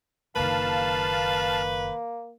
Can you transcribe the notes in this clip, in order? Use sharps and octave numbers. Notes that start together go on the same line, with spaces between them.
F#1 D#3 A#3 B4 F5 A5